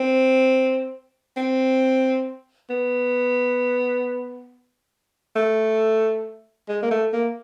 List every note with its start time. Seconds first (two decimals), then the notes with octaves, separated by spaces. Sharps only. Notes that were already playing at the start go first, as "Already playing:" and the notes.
Already playing: C4
1.37 C4
2.70 B3
5.35 A3
6.69 G#3
6.82 A#3
6.91 A3
7.13 A#3